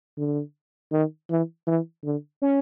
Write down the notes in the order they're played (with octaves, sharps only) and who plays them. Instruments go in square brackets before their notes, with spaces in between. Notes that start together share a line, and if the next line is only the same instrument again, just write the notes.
[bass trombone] D3
D#3
E3
E3
D3
[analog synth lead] C#4